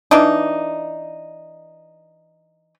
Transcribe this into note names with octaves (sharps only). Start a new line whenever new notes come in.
E3 D4 D#4